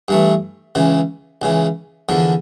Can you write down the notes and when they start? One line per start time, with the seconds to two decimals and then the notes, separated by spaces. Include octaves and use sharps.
0.08 G2 E3 A3
0.75 C#2 C#3 E3
1.42 C#2 C#3 E3
2.09 E2 D3 F3